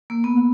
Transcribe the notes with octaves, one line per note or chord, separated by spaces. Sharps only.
A#3
B3